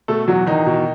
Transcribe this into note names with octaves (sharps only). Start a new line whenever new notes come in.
B2 A3 A4
E2 F#3 F#4
E2 D#3 D#4
B2